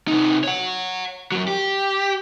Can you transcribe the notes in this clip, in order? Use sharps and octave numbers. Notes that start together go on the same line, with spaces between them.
C3 D#4
C#5 F#5
F#2 F#3
G4